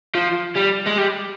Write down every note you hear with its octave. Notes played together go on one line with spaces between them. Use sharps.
F3
G3
G#3
G3